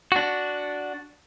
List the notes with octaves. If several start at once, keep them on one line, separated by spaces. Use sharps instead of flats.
D4 F#4